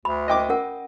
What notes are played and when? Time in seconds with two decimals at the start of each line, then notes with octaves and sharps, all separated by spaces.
0.05 D2 B5
0.28 D#5 G5 D6
0.49 C#4 A#4 F#5